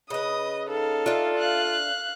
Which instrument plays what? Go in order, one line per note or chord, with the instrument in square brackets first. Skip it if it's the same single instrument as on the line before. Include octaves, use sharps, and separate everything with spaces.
[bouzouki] C#3 B4 [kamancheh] D#5 [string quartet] D#6
[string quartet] D#4 F5 [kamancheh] A4
[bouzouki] D4 E5 [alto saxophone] F4
[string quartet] F5 F#6